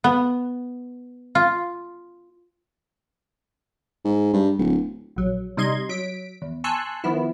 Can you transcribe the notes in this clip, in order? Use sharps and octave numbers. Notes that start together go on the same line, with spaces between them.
B3
F4
G#2
G2
D1
A#1 F#3
C3 G3 D#4 D#5 C6 G#6
F#3 B6 D7
E2
G#5 A5 C6 C#6 E6 F#6
D#3 F3 B3 E4